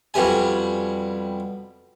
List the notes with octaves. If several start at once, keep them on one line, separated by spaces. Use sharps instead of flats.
F2 B2 G3 G#5